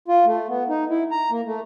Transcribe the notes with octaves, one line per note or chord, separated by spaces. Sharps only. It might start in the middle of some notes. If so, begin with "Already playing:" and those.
F4
A3
B3
D#4
E4
A#5
A#3
A3